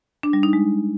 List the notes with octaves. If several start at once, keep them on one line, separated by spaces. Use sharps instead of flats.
D4
G3
D#4
G#3